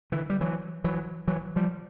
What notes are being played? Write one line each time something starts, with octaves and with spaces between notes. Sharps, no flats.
D3 E3
G3
E3 F#3
E3 F#3
E3 F#3
F3 G3